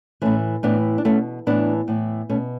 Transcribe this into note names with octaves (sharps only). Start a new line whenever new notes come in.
A2 E3 A3 C#4
A2 E3 B3 D4
D4
B2 A3 C#4
A2 E3 B3 D4
A2 E3
B2 A3 C#4